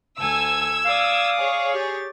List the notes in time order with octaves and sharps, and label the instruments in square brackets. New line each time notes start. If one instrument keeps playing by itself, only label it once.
[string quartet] D2 A4 G#5 [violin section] E6 G#6
[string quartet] D5 D6 D#6 [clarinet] F5
[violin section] G#4 C#5
[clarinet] G4 [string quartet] A6